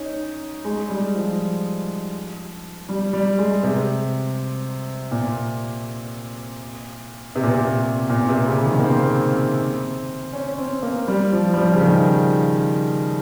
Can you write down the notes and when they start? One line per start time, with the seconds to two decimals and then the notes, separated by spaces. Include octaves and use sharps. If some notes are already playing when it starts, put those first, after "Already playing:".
Already playing: C#4 D#4
0.65 G#3
0.90 G3
1.15 F3
2.89 G3
3.13 G3
3.38 G#3
3.63 C3
5.11 A#2
7.35 C3
7.43 A#2
7.51 C3
8.09 A#2
8.29 C3
8.47 C#3
8.66 D#3
8.79 A#3
8.84 C4
10.33 C#4
10.52 C#4
10.58 C4
10.82 A#3
11.08 G3
11.32 F3
11.53 G3
11.57 F3
11.73 C#3
11.82 D#3